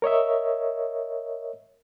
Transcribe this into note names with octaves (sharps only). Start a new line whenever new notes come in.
A#4 C#5 D#5 E5